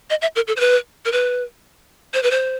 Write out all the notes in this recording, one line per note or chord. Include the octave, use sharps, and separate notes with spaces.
D#5
E5
A#4
A4
C5
B4
A#4
B4
C5
B4
C5